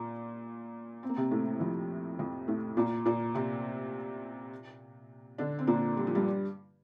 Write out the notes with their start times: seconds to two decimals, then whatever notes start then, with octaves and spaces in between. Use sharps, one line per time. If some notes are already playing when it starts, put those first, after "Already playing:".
Already playing: A#2 A#3
1.03 C4
1.09 A#3
1.16 C3 C4
1.31 A2 A3
1.60 F2 F3
2.19 F2 F3
2.48 A2 A3
2.77 A#2 A#3
3.05 A#2 A#3
3.35 C3 C4
5.38 D3 D4
5.59 C4
5.67 A#2 A#3
5.97 G3
6.07 F3
6.15 G2 G3